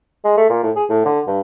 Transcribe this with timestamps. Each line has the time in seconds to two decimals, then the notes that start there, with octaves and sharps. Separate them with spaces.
0.25 G#3
0.38 A3
0.50 A#2
0.64 A2
0.76 G#4
0.90 A2
1.05 D3
1.27 G2